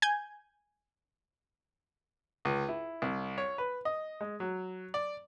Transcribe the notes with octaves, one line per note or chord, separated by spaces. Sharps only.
G#5 G6 G#6
C#2
E4
C2
C#5
B4
D#5
G#3
F#3
D5